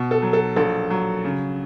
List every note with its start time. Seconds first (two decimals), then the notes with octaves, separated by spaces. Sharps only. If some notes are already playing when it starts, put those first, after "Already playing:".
Already playing: B2
0.11 A4
0.22 F#3
0.33 A4
0.56 A#1 A4
0.90 F#3
1.25 C#3